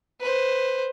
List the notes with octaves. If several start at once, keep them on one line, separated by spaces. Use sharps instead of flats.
B4 C5